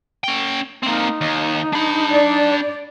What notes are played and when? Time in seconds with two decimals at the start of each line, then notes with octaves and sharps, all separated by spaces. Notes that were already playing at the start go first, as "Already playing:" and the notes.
0.24 C#4 G5
0.83 A#3 C4 D#4
1.21 D#2
1.73 D4 B5
2.10 D5